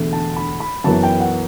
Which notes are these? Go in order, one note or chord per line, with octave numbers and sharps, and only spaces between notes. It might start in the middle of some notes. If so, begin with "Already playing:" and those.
Already playing: E1 E2 D3 A3
A5
B5
B5
F#2 E3 B3 A5
G5
F#5